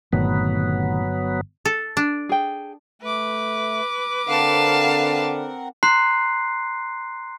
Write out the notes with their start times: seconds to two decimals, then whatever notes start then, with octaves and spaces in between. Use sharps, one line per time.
0.13 G1 A#2 D#3 F#3 A3 B3
1.65 A4
1.97 D4
2.29 G#4 G5
3.02 A3 B4 D6
4.28 D3 C4 A#4 F5 F#5 A5
5.83 A#5 C6 F#6 C7